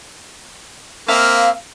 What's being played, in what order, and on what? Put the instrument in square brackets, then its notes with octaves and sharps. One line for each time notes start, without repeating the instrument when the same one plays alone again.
[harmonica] A#3 C4 [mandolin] E5 F5